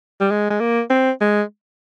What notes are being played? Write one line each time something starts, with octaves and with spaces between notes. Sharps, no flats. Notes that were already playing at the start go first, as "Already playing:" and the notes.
G3
G#3
G#3
A#3
C4
G#3